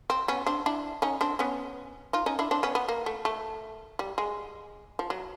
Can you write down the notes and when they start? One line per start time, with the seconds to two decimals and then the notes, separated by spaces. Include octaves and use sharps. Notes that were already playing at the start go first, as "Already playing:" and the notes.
0.10 C4
0.28 B3 C#4
0.46 C4 D4
0.66 D4 E4
1.02 C#4 D#4
1.21 C4 D4
1.39 B3 C#4
2.13 D#4 F4
2.26 C#4 D#4
2.39 D4 E4
2.51 C4 D4
2.63 B3 C#4
2.75 B3
2.89 A#3
3.06 A3
3.25 A3
3.99 G3
4.18 G#3
4.99 F3
5.10 F#3